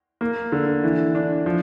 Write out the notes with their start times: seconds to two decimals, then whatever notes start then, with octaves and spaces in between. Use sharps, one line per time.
0.21 A#3
0.52 D3
0.84 E3
1.15 D4
1.46 F3